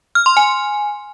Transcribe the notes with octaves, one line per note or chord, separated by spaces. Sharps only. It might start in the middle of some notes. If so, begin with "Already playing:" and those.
F6
C6
G#5